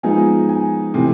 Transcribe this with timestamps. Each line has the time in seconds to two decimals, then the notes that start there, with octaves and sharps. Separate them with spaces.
0.03 F3 G#3 B3 D#4 G#5
0.49 G#5
0.94 C3 E3 A3